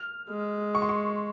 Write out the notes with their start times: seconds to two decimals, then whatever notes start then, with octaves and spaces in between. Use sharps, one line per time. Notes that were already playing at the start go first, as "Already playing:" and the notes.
Already playing: F6
0.29 G#3
0.75 C#6
0.82 C6
0.89 C#6